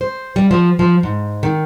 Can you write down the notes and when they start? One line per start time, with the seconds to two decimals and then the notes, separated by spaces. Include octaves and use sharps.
0.01 C5
0.36 G3
0.51 F3
0.79 F3
1.03 G#2
1.43 D#3